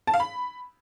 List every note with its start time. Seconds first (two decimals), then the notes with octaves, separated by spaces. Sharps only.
0.07 A5
0.14 F5
0.20 B5